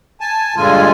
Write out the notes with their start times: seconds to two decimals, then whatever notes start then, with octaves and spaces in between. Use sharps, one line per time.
0.21 G#5 A5
0.56 G2 A#2 D3 G#3 F4 G#5